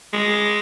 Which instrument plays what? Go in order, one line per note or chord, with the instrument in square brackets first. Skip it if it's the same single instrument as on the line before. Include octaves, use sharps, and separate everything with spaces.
[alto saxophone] G#3